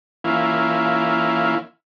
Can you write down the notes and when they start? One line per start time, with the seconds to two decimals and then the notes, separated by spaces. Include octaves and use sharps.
0.24 E3 A#3 C#4 E4 F4